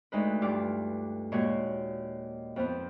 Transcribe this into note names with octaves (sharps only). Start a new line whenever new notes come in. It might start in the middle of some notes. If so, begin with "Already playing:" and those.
D2 G#3 D#4 B4
G2 F4 D6
D#2 A#2 G#3 F#4 C#5
F2 F3 B3